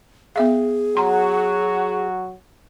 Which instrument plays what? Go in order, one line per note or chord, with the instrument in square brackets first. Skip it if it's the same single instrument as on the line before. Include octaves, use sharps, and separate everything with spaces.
[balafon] B3 E5 F5 [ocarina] G#4
[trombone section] F#3 F#4 [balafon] A#5 C6